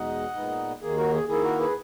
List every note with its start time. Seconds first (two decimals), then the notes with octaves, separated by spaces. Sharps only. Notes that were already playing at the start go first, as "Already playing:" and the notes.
Already playing: E2 B2 G#3 D#4 D#5 F#5
0.35 A#2 G#3 B3 D#4
0.81 D#2 D#3 A#3 G#4
0.97 F#4 A#4
1.12 G#4
1.28 D#3 A#3 E4 G#4
1.44 F#4 A#4
1.59 G#4 B4